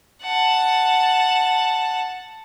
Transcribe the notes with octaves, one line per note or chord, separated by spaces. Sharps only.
F#5 A5